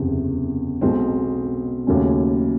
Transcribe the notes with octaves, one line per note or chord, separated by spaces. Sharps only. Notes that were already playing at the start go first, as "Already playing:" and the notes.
Already playing: F#1 E2 C3
B1 B2 G#3 C4
D#2 C#3 F#3 A3 C#4